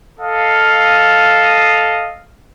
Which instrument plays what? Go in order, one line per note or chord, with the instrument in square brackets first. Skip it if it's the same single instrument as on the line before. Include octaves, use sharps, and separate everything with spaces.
[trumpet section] A4 D#5 F5